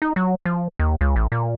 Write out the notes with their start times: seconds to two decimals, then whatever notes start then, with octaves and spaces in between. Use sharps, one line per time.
0.02 D#4
0.16 F#3
0.45 F3
0.79 D#2
1.01 C#2
1.16 A1
1.32 A#2